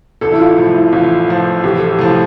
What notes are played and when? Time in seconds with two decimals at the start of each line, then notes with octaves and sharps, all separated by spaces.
0.21 A1 A4
0.32 E4
0.39 F4
0.57 A2 F3
0.74 E4
0.92 A1 F4
1.28 A2 F3
1.63 A1 G4
1.78 A4
1.91 G4
1.99 A2 F3